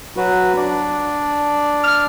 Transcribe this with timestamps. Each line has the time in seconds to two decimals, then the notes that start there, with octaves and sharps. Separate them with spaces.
0.17 F#3 F#4 B4
0.57 D4 D5
1.84 F6